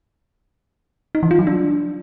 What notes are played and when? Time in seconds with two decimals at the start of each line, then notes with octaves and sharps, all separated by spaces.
1.15 D#4
1.23 E3
1.31 F4
1.39 F#3
1.47 D4